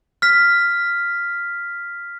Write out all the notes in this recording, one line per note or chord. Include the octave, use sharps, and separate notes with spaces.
F6 B6